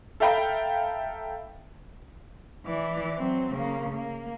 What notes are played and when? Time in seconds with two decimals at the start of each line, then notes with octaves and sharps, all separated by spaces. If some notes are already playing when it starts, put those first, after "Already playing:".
0.20 A4 E5 F5 G5 A#5 B5
2.66 E3 D5
3.17 F#3 C4
3.53 C#3 A#3
3.91 A#3